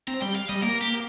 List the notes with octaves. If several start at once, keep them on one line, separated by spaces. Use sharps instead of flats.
C4 A#5
G3 G5
F5
G3 D#5
A#3 A#4
G4